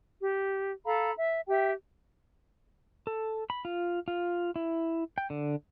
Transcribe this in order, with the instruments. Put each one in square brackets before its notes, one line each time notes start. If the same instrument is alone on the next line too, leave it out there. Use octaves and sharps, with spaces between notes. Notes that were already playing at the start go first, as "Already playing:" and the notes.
[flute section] G4
A4 F5 A#5 B5
E5
G4 E5 G5
[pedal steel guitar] A4
B5
F4
F4
E4
G5
D3